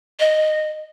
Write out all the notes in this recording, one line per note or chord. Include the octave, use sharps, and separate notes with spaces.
D#5